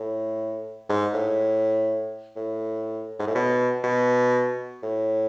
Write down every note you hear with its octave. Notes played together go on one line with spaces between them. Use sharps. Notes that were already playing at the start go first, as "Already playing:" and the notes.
Already playing: A2
G#2
A2
A2
G#2
A2
B2
B2
A2